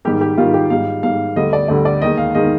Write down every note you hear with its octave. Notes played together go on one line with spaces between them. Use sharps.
G#2 D#3 G3 G4
G4
G#2 D#3 G3 F4
G4
G#2 G3 F5
G#2 G3 F5
D2 D3 G3 D#5
D5
D2 D3 G3 D5
D5
D#2 D#3 G#3 D#5
F5
D#3 G#3 D#5